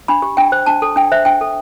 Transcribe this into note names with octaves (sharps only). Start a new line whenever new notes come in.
D4 B5
G4
D4 G5
C5
D4 A5
A4
D4 G5
C5 E5
D4 G5
A4